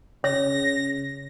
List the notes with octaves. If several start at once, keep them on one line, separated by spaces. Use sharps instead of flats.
C#3 C#5 A#6